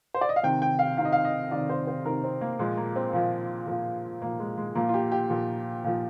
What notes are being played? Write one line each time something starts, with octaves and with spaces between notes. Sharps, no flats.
C5
D5
D#5
F5
C3 D#3 G5
G5
F5
C3 D#3 F5
D#5
F5
D#5
C3 D#3 D5
C5
C5
C3 D#3 A#4
C4
A#3
A#2 F3 G#3
A#3
C4
A#2 F3
A#2 F3
A#2 F3 A#3
G#3
G#3
A#2 F3 A#3
F4
G4
G4
A#2 F3
A#2 F3